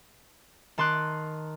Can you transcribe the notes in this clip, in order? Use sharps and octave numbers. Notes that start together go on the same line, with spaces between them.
D#3 A5 C6 D6 F#6